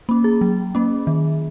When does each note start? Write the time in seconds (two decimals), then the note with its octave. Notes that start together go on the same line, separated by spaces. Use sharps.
0.09 A#3 C#4
0.24 G#4
0.41 F#3
0.75 A#3 C#4
1.07 D#3